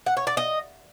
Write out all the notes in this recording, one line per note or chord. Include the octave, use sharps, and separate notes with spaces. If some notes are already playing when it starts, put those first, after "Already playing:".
F#5
C#5
D5
D#5